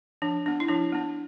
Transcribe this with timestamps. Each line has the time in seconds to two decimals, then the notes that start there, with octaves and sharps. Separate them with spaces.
0.22 F3 D4
0.46 B3 D4
0.60 E4
0.69 F3 D4
0.92 B3 D4